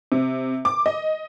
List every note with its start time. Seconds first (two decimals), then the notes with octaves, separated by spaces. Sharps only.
0.12 C3
0.65 D6
0.86 D#5